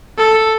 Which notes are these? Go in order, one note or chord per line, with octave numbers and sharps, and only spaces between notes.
A4